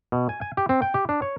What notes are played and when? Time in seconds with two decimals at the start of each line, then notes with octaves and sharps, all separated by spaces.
0.12 B2
0.29 G#5
0.41 G#5
0.57 G4
0.69 C4
0.82 G5
0.94 G4
1.09 D4
1.22 C#5